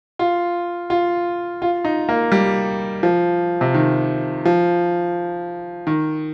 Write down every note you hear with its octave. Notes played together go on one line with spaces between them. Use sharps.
F4
F4
F4
D#4
A#3
G3
F3
C3
D#3
F3
D#3